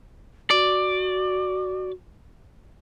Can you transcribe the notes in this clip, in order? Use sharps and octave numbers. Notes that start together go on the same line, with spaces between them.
F#4 D5